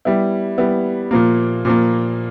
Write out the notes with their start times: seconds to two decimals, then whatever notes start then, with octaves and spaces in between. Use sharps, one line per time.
0.05 G3 B3 E4
0.58 G3 B3 E4
1.11 A#2 F3 A#3
1.65 A#2 F3 A#3